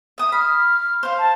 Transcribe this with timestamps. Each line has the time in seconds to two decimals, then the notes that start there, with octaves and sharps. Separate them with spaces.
0.18 E5 D#6
0.32 B5 F6
1.03 C5 F5
1.19 A5